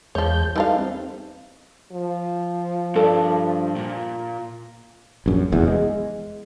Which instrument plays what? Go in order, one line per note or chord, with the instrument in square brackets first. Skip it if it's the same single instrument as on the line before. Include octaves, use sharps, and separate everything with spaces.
[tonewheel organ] E2 G#3 G6 [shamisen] F3 C#5
[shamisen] E3 A3 F5 [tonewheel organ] G3 D#4
[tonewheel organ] C4
[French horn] F3
[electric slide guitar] G2 [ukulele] A4 D5
[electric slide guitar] A#2
[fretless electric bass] A#1 F#2
F1 E2
G#3